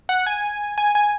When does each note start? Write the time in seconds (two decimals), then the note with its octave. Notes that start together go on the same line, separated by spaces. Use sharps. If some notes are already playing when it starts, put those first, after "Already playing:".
0.09 F#5
0.26 G#5
0.78 G#5
0.95 G#5